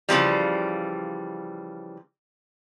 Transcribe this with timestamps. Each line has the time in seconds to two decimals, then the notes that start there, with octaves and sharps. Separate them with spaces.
0.09 C#3 E3 F3 G3